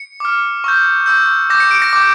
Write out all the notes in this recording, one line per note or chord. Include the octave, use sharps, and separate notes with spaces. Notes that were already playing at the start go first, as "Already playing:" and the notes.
Already playing: C#7
D6 F6
C#6 E6 G6
C#6 E6 G6
D6 G6 A#6
C#7
D7
A#6
D6 G6